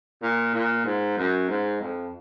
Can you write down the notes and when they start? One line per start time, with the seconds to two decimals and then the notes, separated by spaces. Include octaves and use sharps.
0.23 A#2
0.54 A#2
0.85 G#2
1.18 F#2
1.49 G#2
1.81 F2